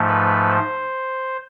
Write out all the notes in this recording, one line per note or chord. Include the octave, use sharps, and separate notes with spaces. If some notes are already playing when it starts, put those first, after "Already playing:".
Already playing: G#2 F3 A3
B4
C5